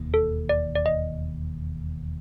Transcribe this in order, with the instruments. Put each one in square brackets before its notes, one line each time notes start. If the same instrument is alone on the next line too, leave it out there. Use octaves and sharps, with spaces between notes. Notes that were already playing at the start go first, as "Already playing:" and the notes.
Already playing: [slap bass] E1 D#2 D#3
[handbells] A4
D5
D5
D#5